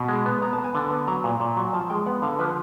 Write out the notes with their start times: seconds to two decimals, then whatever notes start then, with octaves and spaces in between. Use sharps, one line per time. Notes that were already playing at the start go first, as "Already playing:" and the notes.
Already playing: B2
0.08 G#3
0.26 B3
0.42 B3 A#5
0.53 A5
0.58 B3
0.64 G#5
0.75 D3 A5
0.91 B3
1.08 F#3 A#5
1.24 A#2
1.40 A#2
1.57 F#3
1.73 F3 A5
1.90 G#3 G5
2.06 B3 F#5
2.22 D3 F5
2.39 F3 B4